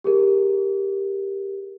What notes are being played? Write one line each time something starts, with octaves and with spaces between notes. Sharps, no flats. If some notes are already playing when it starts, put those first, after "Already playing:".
G4 G#4 A#4